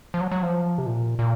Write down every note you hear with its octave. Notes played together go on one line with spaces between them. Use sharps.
F3
F#3
F#3
F3
C3
A#2
A#2